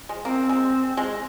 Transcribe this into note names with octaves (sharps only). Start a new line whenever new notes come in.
G#3
A#3 C4
G#3
G#3